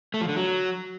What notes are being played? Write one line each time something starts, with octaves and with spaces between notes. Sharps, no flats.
A3
F3
D3
F#3